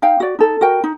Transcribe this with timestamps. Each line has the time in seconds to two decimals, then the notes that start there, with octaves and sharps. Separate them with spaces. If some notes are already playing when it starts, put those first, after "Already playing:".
0.02 D#4 F5 G5
0.20 F#4 D5
0.39 D#4 A4
0.61 F#4 A#4 G5
0.84 D#4